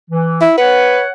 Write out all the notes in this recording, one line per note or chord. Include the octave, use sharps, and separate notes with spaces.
E3
E4
B4 C#5 F#5